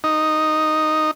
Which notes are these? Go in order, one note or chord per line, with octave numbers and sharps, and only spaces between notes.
D#4